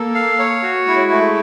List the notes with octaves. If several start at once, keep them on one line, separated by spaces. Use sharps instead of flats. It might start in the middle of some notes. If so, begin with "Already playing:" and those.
Already playing: A#3 A4
F5
C#5
F#4
G#3 E4
A3